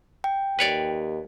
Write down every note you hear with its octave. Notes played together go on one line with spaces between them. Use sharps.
G5
D#2 B4 C#5 D5